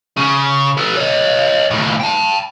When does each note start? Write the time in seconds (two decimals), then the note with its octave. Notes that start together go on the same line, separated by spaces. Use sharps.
0.17 C#3
0.77 A4 B4
0.97 C#5 D#5
1.71 D#2 A2
2.00 G5 A5